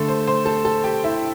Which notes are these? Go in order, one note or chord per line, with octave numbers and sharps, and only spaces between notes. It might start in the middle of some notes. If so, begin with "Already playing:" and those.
Already playing: D3 A3 A4
C5
C5 C6
A4 A5
A4 A5
G4 G5
E4 E5